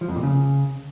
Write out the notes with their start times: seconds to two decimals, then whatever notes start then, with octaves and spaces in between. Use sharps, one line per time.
0.01 F3
0.09 F2
0.16 A#2
0.23 C#3